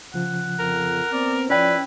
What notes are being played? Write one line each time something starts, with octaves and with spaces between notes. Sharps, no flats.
C#3 F3 F#5
F2 A#4
B3 C4 D5
F3 C#4 E4 B4 D5 G5